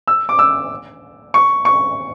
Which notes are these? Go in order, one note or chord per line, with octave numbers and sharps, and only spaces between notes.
E6
D6
E6
C#6
C#6